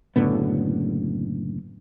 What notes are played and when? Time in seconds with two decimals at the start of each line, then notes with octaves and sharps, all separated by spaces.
0.16 F#1 A2 D3 B3